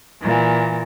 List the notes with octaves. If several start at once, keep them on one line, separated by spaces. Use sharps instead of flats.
A#2 E3